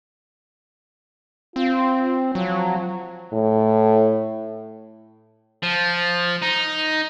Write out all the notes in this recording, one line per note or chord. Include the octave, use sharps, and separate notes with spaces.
C4 F4
F3 F#3
A2
F3
D#4